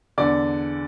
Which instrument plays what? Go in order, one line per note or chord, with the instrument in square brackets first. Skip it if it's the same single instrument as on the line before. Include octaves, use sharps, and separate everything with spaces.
[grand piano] E2 D3 D5